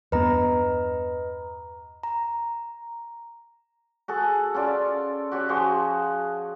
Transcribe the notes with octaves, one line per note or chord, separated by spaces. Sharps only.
E2 G2 B3 B4 D#5 A#5
A#5
F#4 G#4 A4
C#4 F4 A4 D5
F#4 G4 C#5
F3 F#4 G#4 C5